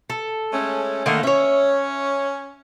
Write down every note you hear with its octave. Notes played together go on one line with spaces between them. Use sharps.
A4
G#3 A3 C#4
D3 D#3 A3 A#3
C#4 C#5 E5